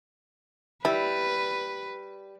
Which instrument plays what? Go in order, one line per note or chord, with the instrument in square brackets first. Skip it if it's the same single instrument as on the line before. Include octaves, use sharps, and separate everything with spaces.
[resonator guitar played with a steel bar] G3 [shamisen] E4 [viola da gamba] B4